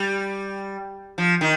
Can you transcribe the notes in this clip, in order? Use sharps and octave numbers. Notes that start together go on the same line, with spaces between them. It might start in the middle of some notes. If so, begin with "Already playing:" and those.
Already playing: G3
F3
D#3